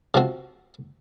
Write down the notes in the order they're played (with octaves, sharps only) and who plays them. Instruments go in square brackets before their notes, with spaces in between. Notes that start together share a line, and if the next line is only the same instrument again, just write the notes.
[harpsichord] C3 F3 C4 F#4